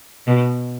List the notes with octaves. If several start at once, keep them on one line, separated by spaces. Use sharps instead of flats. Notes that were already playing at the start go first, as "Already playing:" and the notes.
B2